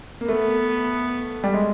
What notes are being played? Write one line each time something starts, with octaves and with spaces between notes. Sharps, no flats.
A#3
A3 B3
G3
G#3